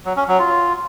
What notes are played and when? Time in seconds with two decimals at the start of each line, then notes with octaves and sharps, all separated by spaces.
0.05 F#3
0.17 C#4
0.28 F#3
0.39 F4